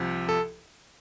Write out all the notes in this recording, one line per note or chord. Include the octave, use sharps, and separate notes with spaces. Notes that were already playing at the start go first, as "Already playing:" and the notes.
Already playing: C2 C3 F3
A4